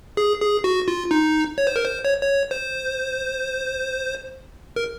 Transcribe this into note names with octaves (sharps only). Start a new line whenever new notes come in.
G#4
G#4
F#4
F4
D#4
C#5
C5
A#4
C5
C#5
C#5
C5
A#4